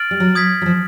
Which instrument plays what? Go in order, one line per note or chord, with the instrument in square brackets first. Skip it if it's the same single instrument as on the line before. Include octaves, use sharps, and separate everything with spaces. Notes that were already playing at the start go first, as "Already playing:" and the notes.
Already playing: [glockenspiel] F6 A6 D7 F#7
[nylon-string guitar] G3
F#3
[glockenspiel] D#6 G#6 B6
[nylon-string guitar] F#3
F3